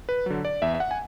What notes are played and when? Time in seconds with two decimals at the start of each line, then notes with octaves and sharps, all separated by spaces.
0.09 B4
0.26 D3 F#3
0.45 D5
0.62 E2 E5
0.75 E5
0.80 F#5
0.91 G#5